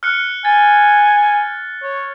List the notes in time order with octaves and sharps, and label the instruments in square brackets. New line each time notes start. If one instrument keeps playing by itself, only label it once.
[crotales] F6 F#6 C#7
[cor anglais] G#5 [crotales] A6
[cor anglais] C#5